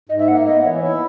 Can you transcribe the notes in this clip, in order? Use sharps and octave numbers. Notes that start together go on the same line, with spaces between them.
G#2 D#5
E5
A#3 F#5
E5
B3 D#5
E3 C#5
E4